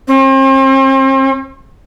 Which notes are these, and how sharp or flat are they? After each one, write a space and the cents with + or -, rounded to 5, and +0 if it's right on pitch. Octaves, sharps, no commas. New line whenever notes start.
C4 +40